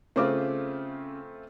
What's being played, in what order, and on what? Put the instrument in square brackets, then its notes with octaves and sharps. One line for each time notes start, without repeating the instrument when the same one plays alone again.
[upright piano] C#3 C5 D6 [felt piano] A3 C4 F4